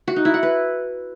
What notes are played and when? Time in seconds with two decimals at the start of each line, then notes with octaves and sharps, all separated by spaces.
0.08 F#4
0.16 D#4
0.25 E4
0.34 F#5
0.43 B4